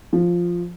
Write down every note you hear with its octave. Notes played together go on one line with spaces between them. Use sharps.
F3